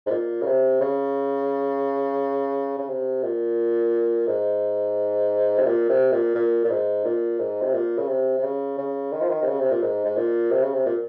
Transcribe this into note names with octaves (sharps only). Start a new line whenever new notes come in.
G#2
A#2
C#3
C3
C#3
C#3
C3
A#2
G#2
C3
A#2
C3
A#2
A#2
A#2
G#2
A#2
G#2
C3
A#2
C#3
C3
C3
C#3
C#3
D#3
F3
D#3
C3
C#3
C3
A#2
G#2
G#2
A#2
C3
C#3
C3
A#2